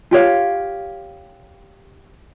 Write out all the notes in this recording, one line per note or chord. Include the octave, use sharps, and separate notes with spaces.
F4 G4 C#5 F5